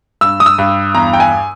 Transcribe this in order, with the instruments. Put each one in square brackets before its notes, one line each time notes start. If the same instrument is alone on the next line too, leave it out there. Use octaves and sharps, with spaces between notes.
[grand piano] G2 E6
D#6
E6
G2
E2 A#5
G5
G#5